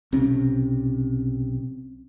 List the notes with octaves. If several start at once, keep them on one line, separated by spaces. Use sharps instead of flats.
B1 C3 C#4